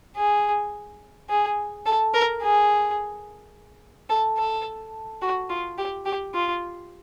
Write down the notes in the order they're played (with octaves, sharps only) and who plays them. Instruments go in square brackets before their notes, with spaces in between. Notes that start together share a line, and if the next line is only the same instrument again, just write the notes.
[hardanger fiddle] G#4
G#4
A4
A#4
G#4
A4
A4
F#4
F4
G4
G4
F4